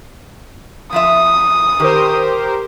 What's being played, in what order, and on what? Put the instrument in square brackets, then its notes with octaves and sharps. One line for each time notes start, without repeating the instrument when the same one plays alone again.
[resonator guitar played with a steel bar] F3 F4 E5 [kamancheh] D#6
[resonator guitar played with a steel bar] D#3 [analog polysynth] G4 A#4 C5